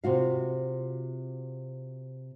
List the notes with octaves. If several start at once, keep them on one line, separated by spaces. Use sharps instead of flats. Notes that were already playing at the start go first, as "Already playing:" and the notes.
C3 F4 F#4 F5